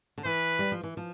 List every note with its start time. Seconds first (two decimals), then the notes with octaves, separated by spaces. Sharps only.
0.18 D3
0.25 E3 B4
0.59 G3
0.72 F3
0.83 E3
0.97 F3